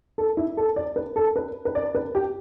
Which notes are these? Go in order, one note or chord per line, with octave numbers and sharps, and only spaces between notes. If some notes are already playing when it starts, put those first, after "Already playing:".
A4
E4
A4
D5
B4
A4
B4
B4
D5
B4
G4